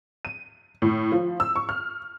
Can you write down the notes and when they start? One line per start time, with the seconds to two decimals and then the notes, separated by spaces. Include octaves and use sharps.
0.25 D#7
0.82 A2
1.12 F3
1.40 E6
1.56 C#6
1.69 F6